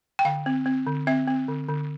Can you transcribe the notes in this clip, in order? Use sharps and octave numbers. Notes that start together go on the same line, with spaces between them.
G5
D3 F5
C4
C4
D3
C4 E5
C4
D3
D3